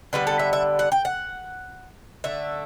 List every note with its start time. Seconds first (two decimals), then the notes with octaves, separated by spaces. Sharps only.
0.13 D3 G3 B3 B4
0.27 A4
0.39 E5
0.53 E5
0.79 F#5
0.92 G5
1.05 F#5
2.24 D3 A3 E5